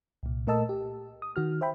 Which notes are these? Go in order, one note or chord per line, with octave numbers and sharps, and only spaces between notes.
C2 A#2
A#2 A3 A#4 D#5 A5 E6
G4
D#6
D#3 F#4 F6
C5 E5 G5 B5